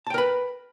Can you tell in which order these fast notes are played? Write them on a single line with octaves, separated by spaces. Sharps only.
A5 G5 A#4 B4